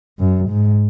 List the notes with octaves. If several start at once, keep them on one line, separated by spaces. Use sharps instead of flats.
F#2
G#2